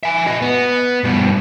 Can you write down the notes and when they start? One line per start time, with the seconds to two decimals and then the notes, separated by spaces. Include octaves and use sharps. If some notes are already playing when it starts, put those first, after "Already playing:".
0.03 E5 G#5
0.26 F#4 D#5
0.42 B3
1.04 G2 B2